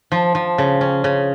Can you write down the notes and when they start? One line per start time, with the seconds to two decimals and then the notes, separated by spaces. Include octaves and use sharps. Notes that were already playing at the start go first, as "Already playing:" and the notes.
0.12 F3
0.35 F3
0.58 C#3
0.81 C#4
1.04 C#3